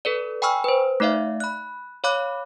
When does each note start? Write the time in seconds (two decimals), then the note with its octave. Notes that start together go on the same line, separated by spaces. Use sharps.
0.05 A4 B4 D5
0.42 G5 G#5 B5 C#6 E6 F6
0.64 B4 C5
1.00 A3 D#4 D5 E5 F5
1.40 B5 F#6
2.04 C#5 F5 B5 D6 F#6